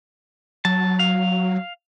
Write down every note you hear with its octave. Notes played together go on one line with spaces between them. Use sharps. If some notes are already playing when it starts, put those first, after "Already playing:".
F#3 A5
F5